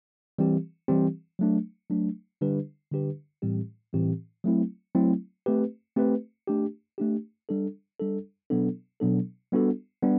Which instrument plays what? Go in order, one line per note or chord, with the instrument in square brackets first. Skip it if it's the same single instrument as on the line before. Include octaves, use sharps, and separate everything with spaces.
[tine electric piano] E3 G3 C4 G4
E3 G3 C4 G4
F#3 A3 D4
F#3 A3 D4
D3 G3 D4 G4 B4
D3 G3 D4 G4 B4
A2 E3 G3 C4 G4
A2 E3 G3 C4 G4
F#3 A3 C4 E4
F#3 A3 C4 E4
A3 C4 G4 B4
A3 C4 G4 B4
A3 D4 G4
A3 D4 G4
G3 D4 A4
G3 D4 A4
B2 F#3 B3 D4 A4
B2 F#3 B3 D4 A4
G3 B3 D4 F#4 A4
G3 B3 D4